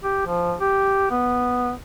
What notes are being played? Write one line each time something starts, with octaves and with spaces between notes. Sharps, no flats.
G4
F3
G4
B3